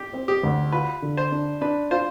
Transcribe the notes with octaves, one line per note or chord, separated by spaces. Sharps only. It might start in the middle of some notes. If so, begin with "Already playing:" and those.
Already playing: G4
C4
G4
D2
F4 B4
D3
C5
D4
D4 B4
F4 C5